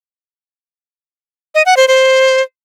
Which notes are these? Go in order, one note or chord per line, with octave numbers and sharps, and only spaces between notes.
D#5
F#5
C5
C5